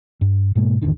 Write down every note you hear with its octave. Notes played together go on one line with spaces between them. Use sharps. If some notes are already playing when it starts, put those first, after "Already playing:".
G2
G#2 B2 G#3 A#3
G#1 E2 D3 D#3